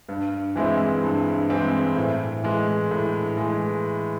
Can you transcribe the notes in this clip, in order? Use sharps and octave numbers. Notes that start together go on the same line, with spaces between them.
G2
E3 G#3 C4 E4
G2
E3 G#3 C4 E4
A2
E3 G#3
A2
E3 G#3